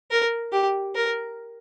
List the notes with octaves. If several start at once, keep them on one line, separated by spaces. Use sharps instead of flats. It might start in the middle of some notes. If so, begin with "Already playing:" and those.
A#4
G4
A#4